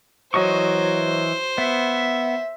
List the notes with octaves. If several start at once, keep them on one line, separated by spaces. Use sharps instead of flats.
E3 F#3 C5 D#5 C#6
B3 E5